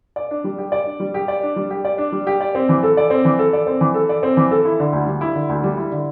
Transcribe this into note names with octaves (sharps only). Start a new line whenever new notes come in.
D5
D4
G3
G4
D5
D4
G3
G4
D5
D4
G3
G4
D5
D4
G3
G4
D5
C4
E3
A4
D5
C4
E3
A4
D5
C4
E3
A4
D5
C4
E3
A4
E4
D3
D2
G3
E4
D3
D2
G3
E4
D3